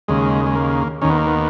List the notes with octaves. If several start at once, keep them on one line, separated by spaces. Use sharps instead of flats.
D#2 C#3 G#3
G#3
A#3
D#2 D#3 C#4
B3
A#3
B3